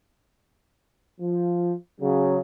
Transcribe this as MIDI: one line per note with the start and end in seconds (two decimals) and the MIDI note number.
1.20 1.73 53
2.01 2.39 49
2.01 2.39 54